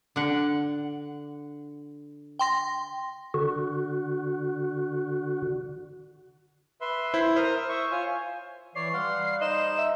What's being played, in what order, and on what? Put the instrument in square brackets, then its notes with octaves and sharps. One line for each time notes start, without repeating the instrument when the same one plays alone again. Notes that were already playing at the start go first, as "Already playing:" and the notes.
[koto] D3 F#5
[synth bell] G5 C6 A#6
[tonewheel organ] D3 F#4
[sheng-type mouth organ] B4 E5 C6
[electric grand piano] E4 C5
[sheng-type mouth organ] A#4 D#6 F6 [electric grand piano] C5
[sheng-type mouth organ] E5
E5 C#6
F4 C#5 G#5
[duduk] E3 [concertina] C#5 D5 [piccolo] C7
[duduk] G3 [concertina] F5 F#5 C6
[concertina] D#4 C5 F#6 [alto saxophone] D#5 [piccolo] E7
[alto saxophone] E5